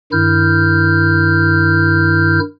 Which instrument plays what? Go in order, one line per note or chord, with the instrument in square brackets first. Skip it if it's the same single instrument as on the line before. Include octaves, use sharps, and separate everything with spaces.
[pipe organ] G2 D#3 E4 F6 G6